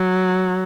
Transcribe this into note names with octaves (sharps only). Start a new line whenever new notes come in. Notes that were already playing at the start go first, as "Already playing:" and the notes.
Already playing: F#3